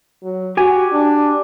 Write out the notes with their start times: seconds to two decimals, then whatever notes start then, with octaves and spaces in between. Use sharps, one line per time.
0.23 F#3
0.57 F#4 G4 G#5
0.93 D4